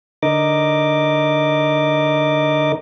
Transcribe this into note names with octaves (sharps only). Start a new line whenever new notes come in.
D3 D#4 A#4 D#5 D6